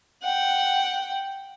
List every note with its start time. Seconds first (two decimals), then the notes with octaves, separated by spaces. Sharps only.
0.23 F#5 G5